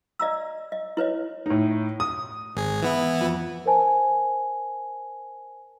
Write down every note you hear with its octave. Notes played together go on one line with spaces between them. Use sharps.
D5 D#5 A#5 E6
D#5
E4 B4 C#5 D#5
A2 D#4
D#6
G#1 G#4
E3 B3 E4
F2
A#4 C5 G#5 A5